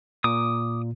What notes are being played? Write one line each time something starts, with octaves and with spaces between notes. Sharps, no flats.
A#2 D6 D#6